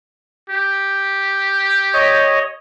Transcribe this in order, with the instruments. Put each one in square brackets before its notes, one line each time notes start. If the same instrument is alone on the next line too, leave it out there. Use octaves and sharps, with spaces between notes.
[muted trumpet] G4
[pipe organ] C#5 D#5